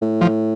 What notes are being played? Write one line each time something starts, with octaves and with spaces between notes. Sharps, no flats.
A2
F3